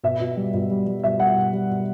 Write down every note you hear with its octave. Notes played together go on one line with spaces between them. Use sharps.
B2 E5
B2
G3
B2
G3
G3
B2 E5
G3 F#5
B2
G3
B2